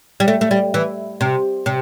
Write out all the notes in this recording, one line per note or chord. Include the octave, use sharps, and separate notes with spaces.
G3
A3
A3
G3
E3
C3
C3